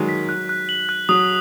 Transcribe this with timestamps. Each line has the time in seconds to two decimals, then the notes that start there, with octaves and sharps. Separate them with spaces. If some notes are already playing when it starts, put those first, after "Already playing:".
Already playing: D#3 F#3 G#3
0.09 B6
0.29 F#6
0.49 F#6
0.69 F#7
0.89 F#6
1.09 F#3 D#6